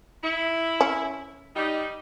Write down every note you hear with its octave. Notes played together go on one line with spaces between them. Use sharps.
E4
C#4
G3 D#4